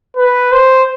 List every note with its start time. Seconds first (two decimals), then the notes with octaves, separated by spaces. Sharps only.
0.17 B4
0.52 C5